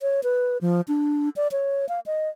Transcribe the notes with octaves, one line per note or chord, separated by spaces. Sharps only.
C#5
B4
F3
D4
D5
C#5
F5
D#5